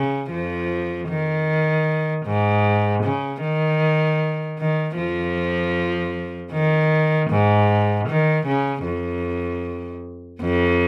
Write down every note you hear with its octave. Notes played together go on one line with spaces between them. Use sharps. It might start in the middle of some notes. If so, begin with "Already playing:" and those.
Already playing: C#3
F2 F3
D#3
G#2
C#3
D#3
D#3
F2 F3
D#3
G#2
D#3
C#3
F2
F2